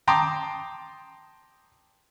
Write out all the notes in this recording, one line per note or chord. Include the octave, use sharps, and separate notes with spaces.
G5 A5 A#5 C6 D6 D#6